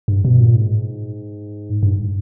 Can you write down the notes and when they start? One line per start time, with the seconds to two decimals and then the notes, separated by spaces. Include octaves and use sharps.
0.08 G2
0.25 B2
0.40 A#2
0.56 G#2
1.83 G2